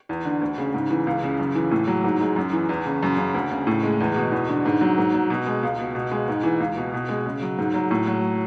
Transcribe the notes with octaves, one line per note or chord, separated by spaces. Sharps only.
E2
D3
D2
C#3
G#2
E3
C#2
C#3
F#2
E3
A2
F#3
G#2
G#3
F#2
E3
E2
C#3
F#2
C#3
D2
C#3
A2
G#3
E2
B2
E2
D3
G#2
F#3
G#2
F#3
B2
G#3
C#2
B2
B2
G#3
G#2
E3
C#2
B2
B2
G#3
C#3
F#3
G#2
F#3
A2
F#3